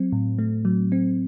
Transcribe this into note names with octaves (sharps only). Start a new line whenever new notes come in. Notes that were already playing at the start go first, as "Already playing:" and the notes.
Already playing: F#3 C4
A2
A3
F#3
C4